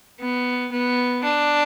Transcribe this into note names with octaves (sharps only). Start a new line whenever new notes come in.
B3
B3
D4